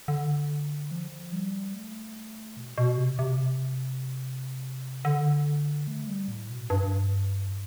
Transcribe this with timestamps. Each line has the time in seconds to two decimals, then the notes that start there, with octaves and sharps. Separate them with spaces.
0.08 D3
0.91 F3
1.32 G3
1.74 A3
2.57 B2
2.78 B2
2.98 C3
3.19 C3
5.05 D3
5.87 A3
6.07 G3
6.28 A2
6.50 B2
6.70 G2